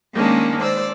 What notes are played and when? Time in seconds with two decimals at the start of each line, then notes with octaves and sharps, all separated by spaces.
0.13 D#3 G#3 A#3 C#4 D4
0.62 C5 D5 E6